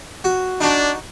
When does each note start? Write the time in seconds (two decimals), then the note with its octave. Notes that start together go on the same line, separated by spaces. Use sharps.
0.24 F#4
0.61 D4 D#4 F#4